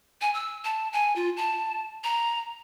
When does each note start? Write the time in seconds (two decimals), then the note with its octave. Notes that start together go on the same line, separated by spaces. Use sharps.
0.21 G#5
0.34 E6
0.64 A5
0.93 G#5
1.16 F4
1.37 A5
2.04 A#5